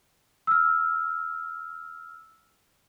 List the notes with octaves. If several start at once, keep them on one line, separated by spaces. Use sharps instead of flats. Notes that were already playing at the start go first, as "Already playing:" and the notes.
E6 F6